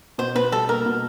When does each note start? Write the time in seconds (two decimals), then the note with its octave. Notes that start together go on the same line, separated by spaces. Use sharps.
0.18 B2 C5
0.36 B2 B4
0.52 G3 A4
0.69 A#3 A#4
0.86 B2